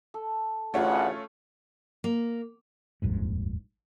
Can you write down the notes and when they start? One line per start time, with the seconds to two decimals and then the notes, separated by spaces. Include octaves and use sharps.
0.14 A4
0.74 A1 D2 C#3 A3 C#4 F4 F#5
2.04 A#3
3.02 D#1 A#1 F2 G#2